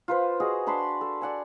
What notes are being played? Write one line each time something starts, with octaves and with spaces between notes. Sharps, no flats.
F4 B4 C5
F#4 G#4 D#5
D4 A5 B5 C6
A4
D5 F#5 G#5